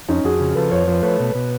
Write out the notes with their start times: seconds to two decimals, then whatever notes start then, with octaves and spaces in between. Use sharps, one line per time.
0.08 F2 C#4 D#4
0.24 F2 F#4 G#4
0.40 C#3
0.55 F3 A4 B4
0.71 F2 B4 C#5
0.88 F3 B4 C#5
1.03 A3 B4 C#5
1.20 B2
1.35 B2